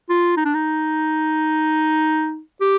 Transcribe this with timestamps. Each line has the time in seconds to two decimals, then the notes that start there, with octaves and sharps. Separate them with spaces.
0.09 F4
0.37 D#4
0.45 D4
0.54 D#4
2.61 G4